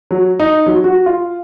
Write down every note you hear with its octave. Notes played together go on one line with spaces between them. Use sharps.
F#3
D#4
F#3
F#4
F4